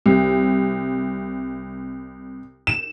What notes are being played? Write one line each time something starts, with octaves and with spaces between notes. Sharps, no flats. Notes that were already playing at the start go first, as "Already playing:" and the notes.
C2
E7